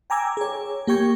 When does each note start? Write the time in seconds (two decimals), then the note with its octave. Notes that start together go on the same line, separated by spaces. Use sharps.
0.10 G5 G#5 A#5 D6 E6 G#6
0.37 G#4 C#5
0.87 A#3 G4 G5 C#6 G#6